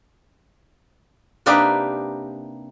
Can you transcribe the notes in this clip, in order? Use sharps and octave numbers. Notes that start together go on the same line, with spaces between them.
C3 A#3 D4 D#4 G4 B4